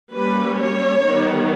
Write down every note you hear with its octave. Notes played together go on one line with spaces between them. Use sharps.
G3 A#3 C#4 B4
C#5
D#3 G3 B3